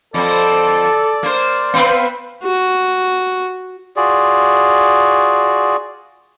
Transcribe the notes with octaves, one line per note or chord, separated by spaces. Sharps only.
F2 C4 A4 D5
A#3 C5
B3 C4 B4 F5
F#4
F4 F#4 G#4 D5